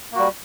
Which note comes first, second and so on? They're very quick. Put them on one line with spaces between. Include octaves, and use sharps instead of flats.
A#3 F#4 G3